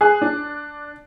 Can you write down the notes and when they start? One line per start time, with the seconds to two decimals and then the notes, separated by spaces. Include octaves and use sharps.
0.01 G#4 F#6
0.22 D4